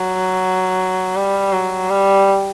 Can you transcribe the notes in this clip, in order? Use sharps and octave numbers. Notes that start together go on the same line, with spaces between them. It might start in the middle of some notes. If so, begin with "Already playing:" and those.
Already playing: F#3
G3
F#3
G3